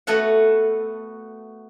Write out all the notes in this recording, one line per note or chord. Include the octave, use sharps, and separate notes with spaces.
A3 B3 F#4 A4 F#5